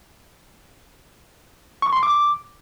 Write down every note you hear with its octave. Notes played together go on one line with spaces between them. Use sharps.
C#6
C6
D6